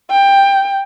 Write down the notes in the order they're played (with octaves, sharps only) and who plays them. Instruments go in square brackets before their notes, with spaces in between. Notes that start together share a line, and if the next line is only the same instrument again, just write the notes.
[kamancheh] G5